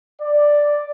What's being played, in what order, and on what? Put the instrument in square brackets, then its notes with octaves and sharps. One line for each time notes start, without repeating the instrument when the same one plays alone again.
[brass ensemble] D5